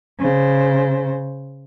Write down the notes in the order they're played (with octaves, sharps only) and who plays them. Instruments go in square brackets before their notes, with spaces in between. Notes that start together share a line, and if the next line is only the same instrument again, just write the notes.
[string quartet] C#3 C5